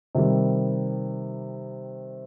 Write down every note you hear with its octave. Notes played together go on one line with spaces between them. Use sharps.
C3 D#3 G3